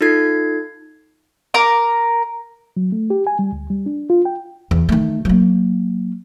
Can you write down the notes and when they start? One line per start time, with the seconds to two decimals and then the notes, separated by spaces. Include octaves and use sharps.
0.01 D#4 F4 A4 G#6 C7
1.54 A#4 A#5 D6
2.77 F#3
2.92 A3
3.10 G4
3.27 G#5
3.39 G3
3.52 D2
3.70 G3
3.86 D4
4.10 F4
4.25 G5
4.71 E2
4.89 D#3 A3
5.25 F#3 A#3